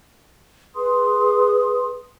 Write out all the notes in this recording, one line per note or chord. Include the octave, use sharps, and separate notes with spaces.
G#4 B4 C6 D#6